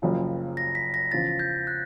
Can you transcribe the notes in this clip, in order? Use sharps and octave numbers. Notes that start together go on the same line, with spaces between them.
F#1 F#2 C#3 F3
A#6
B6
A#6
E2 C#3 F3 A6
G6
F#6